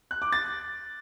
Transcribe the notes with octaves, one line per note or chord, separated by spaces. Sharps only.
F#6
D6
A6